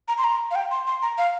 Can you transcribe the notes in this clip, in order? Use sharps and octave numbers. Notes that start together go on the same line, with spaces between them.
A#5
C6
A#5
F5
G5
C6
C6
A#5
F5